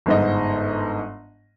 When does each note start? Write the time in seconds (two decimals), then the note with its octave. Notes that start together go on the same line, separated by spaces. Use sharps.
0.06 G1 G#2 D#5